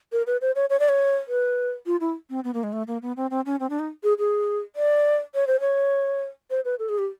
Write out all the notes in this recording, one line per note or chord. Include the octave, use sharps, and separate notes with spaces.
A#4
B4
C5
C#5
C#5
D5
C#5
B4
F4
E4
C4
B3
A#3
G#3
A3
A#3
B3
C4
C4
C#4
C4
D4
D#4
G#4
G#4
D5
C#5
C5
C#5
C5
B4
A4
G#4
G4